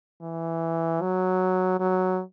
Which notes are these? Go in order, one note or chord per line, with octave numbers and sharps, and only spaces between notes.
E3
F#3
F#3